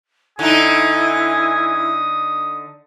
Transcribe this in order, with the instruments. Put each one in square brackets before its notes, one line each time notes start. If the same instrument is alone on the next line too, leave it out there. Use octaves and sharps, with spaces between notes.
[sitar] D3 D#4 [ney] E4 [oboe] G#5 [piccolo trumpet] D#6